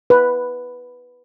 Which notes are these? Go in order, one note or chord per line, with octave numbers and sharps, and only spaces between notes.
B4